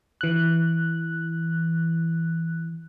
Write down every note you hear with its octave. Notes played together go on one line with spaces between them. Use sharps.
E3 F#6